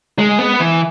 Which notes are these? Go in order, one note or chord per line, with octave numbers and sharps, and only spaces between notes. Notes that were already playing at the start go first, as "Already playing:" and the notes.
G#3
B3
E3